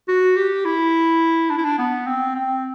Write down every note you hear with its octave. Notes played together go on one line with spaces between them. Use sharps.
F#4
G4
E4
D4
E4
D4
B3
C4
C4